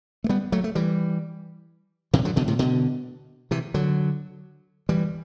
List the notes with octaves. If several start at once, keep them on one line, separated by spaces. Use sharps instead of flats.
A3
G3 B3
F#3 A3
A3
E3 G3
C3 E3
D3 F#3
B2 D3
A2 C3
B2 D3
C3 E3
D3 F#3
E3 G3